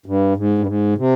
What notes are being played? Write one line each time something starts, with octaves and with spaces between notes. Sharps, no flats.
G2
G#2
G2
G#2
C3